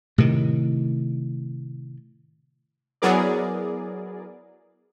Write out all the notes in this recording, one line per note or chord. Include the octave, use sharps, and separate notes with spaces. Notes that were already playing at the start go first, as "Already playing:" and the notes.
A2 C3 D#3
F#3 B3 E4 G#4 A#4 D5